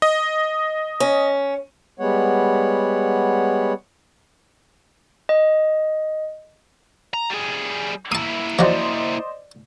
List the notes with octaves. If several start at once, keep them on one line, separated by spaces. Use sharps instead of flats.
D#5
C#4
G3 G#3 B3 C#5 F#5
D#5
A#5
G3 G#4
A#3 E4 A5 D#6
F3 F#3 C5 D5 D#5